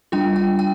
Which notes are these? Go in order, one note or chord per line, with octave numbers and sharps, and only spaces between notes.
G3 D4 F4 G5
G5
G5